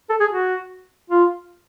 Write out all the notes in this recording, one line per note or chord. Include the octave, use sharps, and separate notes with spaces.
A4
G#4
F#4
F4